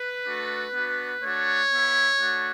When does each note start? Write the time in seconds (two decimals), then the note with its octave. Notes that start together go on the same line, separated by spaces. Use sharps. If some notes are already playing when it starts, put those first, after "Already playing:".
Already playing: B4
0.26 A3 D4 F#4
0.74 B3 D4 F#4
1.22 A3 D4 F#4 C#5
1.71 B3 E4
2.19 A3 D4 F#4